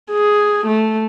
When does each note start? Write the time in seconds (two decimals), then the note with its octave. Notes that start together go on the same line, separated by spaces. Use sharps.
0.12 G#4
0.67 A3